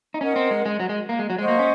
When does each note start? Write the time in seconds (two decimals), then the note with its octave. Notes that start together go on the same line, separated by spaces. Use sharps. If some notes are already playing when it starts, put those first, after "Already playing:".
0.14 D#4
0.21 C#4 A#4 D#5 F#5
0.36 C4
0.51 G#3
0.66 G#3
0.80 F#3
0.89 G#3
1.09 A#3
1.19 G#3
1.30 F#3
1.38 G#3 C5 D#5 F#5 C#6
1.48 A#3
1.59 C#4